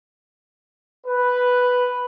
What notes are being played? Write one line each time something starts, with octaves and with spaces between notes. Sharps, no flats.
B4